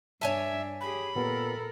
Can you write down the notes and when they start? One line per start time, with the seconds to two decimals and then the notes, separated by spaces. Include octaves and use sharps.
0.21 G2 D4 C#5 E5 G#5 A5
0.81 G4 G#4 B5
1.16 A#2 B3 G4 A4 A#4